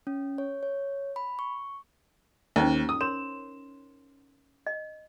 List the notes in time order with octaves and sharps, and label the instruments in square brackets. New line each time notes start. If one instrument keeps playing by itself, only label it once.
[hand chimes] C#4
C#5
C#5
B5
C#6
[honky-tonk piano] D#2 [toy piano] C#4 D#4 C5
[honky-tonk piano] D#6
[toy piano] A#4 C#5 C6 [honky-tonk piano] E7
[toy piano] D#5